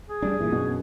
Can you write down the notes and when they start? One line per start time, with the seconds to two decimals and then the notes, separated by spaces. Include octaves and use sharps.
0.09 G#4
0.22 D2 G3 D4
0.39 G1 A#2 E3
0.52 F#2 B2